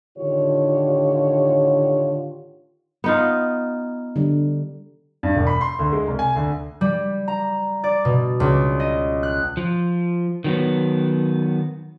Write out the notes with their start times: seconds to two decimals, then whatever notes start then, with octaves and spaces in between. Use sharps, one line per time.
0.18 A2 D3 D#3 F4 G4 C#5
3.04 B3 D#4 F4
4.16 D3 G3
5.23 G2
5.35 E1
5.47 B5
5.61 C6
5.79 D2
5.93 G#3
6.08 C2
6.19 G#5
6.36 D2
6.81 G3
7.28 A#5
7.84 D5
8.05 B2
8.40 C#2
8.80 D#5
9.23 F#6
9.57 F3
10.44 D#3 F#3 B3